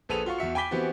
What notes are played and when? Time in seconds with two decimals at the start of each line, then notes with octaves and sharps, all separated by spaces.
0.09 A#1 G#4 A4 B4 D#7 F7
0.26 F4 F#4 F5 C#6
0.38 E2 F#4 E5 C#7
0.55 G5 G#5 B5 D6 B6 G7
0.71 E3 B3 C4 F#4 G4